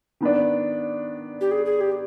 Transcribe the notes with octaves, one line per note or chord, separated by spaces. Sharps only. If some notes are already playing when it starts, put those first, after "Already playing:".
D#3 B3 D4
G4
G#4
G#4
G4